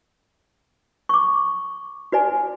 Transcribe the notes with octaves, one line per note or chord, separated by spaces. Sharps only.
C#6 D6
F#4 B4 D5 G#5